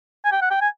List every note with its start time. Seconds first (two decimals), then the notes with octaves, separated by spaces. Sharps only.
0.24 G#5
0.32 G5
0.41 F#5
0.51 G5
0.61 G#5